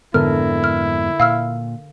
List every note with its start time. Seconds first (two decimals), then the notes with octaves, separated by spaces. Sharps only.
0.14 F2 G#2 D3 B3 E4 A4 A#4 F6
0.64 F6
1.20 A#2 F5 E6 F6